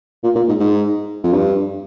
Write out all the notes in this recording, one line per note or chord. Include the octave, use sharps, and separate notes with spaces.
A#2
A#2
G#2
G#2
F2
G2